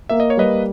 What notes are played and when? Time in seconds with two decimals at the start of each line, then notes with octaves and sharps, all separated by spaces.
0.09 A#3 E5
0.20 D#5
0.30 C#5
0.37 G3 B4 D#5